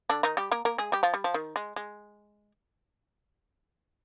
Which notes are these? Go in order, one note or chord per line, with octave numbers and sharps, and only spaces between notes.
D3 D4
D#3 D#4
G3 G4
A#3 A#4
A#3 A#4
G#3 G#4
G3 G4
F3 F4
G3
F3
D#3
G#3
G#3